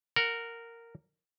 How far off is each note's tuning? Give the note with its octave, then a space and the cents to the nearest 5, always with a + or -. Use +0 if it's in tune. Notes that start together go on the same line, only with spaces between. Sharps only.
A#4 -10 F#5 +0